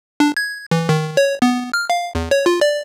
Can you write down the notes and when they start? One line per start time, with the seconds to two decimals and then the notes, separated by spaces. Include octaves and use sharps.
0.20 D4
0.37 G#6
0.71 E3
0.89 D#3
1.17 C#5
1.42 B3
1.73 F6
1.90 F5
2.15 E2
2.31 C#5
2.46 F4
2.61 D5